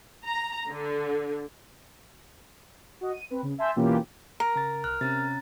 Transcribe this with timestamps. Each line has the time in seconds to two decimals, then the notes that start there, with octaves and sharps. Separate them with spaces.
0.25 A#5
0.69 D3
3.01 F#4 D#5
3.13 D#7
3.30 C4 B4
3.42 C#3
3.59 E5 G#5 A5 C6 E6 G6
3.76 B2 E3 A#3 C#4 F4 G4
4.40 A#4 A#5
4.56 C#3 A#5 A6
4.84 C2 F6 F#6
5.01 C3 C#4 A#5 A6